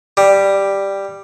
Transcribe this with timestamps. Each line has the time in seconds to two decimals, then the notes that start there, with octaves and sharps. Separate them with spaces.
0.17 G3